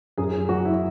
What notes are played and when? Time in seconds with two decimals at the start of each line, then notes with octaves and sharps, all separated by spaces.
0.18 F#2 G#4
0.33 G#4
0.49 F#3 F#4
0.65 E4